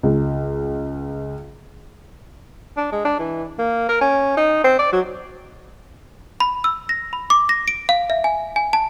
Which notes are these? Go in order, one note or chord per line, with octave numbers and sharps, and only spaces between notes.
C#2
D4
G#3
D4
E3
A#3
A#4
C#4
D#4
C4
D5
F#3
B5
E6
A#6
B5
D6
A#6
D7
F5
E5
G#5
G#5
A5